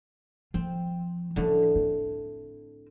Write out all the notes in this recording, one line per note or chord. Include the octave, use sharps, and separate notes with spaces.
F3 C4
A2 D3 F3 C#4
C4